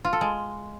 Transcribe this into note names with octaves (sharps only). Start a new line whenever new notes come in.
F4
A4
G#3